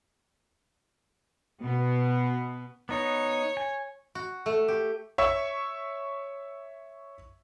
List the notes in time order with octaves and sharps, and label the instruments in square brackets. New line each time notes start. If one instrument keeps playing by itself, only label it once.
[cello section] B2 B3
[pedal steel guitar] B3 D#4 [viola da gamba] C#5
[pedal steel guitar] G#5
[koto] F#4
A3
G4
[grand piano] C#5 E5 C#6 E6